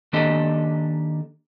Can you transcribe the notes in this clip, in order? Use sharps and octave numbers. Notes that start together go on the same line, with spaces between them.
D#3 A#3 D4 G4 A4 D#5